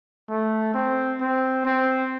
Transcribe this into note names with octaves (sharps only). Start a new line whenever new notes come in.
A3
C4
C4
C4